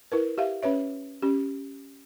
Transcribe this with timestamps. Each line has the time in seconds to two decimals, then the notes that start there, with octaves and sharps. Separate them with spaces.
0.12 E4 A#4 B4
0.38 G4 E5 F5
0.62 C#4 B4 C#5 E5
1.22 C#4 G4